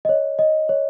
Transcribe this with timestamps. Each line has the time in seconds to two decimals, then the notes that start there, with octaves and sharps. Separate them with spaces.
0.05 D#5
0.09 C#5
0.39 D#5
0.69 C#5